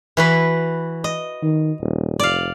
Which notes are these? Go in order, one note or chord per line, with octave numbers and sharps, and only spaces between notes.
E3 F#4 B4
D#5
D#3
D#1
F1 D5 F5